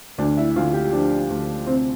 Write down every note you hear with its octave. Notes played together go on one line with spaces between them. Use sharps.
D2 D4
E4
D2 F4
G4
F3 D4
D2
C3 C4